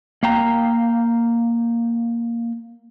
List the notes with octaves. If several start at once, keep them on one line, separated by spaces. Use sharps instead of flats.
A#3 F5 G5 A#5